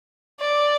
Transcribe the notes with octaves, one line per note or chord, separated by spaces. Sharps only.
D5